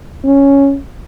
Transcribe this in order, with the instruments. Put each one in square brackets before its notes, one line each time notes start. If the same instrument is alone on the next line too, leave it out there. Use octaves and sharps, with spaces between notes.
[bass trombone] C#4